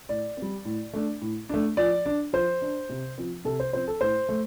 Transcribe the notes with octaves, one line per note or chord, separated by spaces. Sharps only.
A2 D5
G3 C4
A2
A3 D4
A2
A3 D4
F3 D5
D4
F3 C5
D4
C3
F3 C4
C3 A4
C5
F3 C4 C5
A4
A2 C5
A3